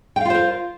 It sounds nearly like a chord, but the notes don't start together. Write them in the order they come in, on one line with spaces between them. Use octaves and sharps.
G5 F5 F4 C5 A#4